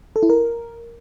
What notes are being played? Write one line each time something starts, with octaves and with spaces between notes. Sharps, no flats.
A4
E4
A#4